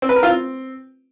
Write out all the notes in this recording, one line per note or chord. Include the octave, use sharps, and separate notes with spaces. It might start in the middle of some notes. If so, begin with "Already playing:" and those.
C4
B4
A#4
F4
C4